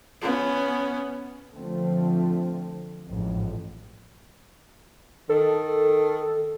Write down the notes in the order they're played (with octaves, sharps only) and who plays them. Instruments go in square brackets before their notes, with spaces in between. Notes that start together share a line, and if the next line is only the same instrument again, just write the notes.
[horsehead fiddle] B3 C#4
[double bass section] D3 F3 A3 C4
A1 F2 G#2
[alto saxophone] D#3 [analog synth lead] A4